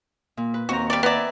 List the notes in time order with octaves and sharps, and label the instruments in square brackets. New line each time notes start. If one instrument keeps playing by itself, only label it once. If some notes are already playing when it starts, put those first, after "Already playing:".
[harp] A#2
B4
[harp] D#2 C4 A#5 [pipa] F#4
[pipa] G3 D5
[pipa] B3 D5 [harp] E5 G#5 A#5